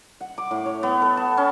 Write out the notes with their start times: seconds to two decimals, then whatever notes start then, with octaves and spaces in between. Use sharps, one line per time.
0.21 F#5
0.38 D6
0.51 A2
0.66 C#5
0.83 B3
1.02 A4
1.17 A5
1.37 C#4